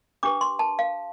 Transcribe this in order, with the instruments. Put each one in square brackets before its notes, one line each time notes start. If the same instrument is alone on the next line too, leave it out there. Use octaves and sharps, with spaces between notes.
[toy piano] D4 G4 B4 D6
C6
A5
F5